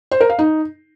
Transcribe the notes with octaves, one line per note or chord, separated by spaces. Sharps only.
C5
A#4
F5
D#4